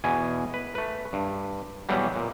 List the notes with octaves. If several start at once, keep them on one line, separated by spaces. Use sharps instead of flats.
E2 B2 G#5
B4
A3 B4
G2
E2 B2 F#3 G3
A#2